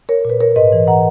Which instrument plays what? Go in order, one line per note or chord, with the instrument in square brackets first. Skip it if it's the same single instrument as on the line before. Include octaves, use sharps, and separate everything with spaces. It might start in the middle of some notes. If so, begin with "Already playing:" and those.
[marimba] A#4 C#5
A#2 B4
A#4 C#5
G#2 B4 D#5
E3
F#5 A#5